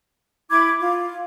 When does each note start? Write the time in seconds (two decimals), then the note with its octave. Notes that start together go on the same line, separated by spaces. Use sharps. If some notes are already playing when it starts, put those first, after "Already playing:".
0.51 E4 B5 D6 G#6
0.80 F4